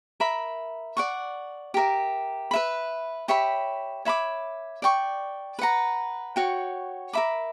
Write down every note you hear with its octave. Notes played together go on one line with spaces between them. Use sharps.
A#4 E5 B5
D5 F#5 C#6
G4 A#4 E5
B4 E5 B5
G4 C#5 E5 B5
C#5 E5 B5 D6
D5 G5 C#6
B4 F#5 A#5
F#4 C#5 G5
A#4 E5 B5 D6